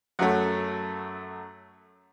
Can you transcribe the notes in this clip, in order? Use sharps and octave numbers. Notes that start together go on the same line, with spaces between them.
F#2 F#3 A3 F#5